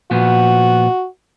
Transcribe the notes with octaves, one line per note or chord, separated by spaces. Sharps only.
A#2 F3 B3 F#4